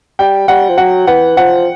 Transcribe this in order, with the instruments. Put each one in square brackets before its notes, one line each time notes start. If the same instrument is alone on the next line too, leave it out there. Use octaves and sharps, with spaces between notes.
[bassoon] G3 [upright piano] G5
[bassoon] G3 [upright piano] F#5
[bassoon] F3
[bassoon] F#3 [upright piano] F#5
[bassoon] E3 [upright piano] F#5
[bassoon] F3 [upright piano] F#5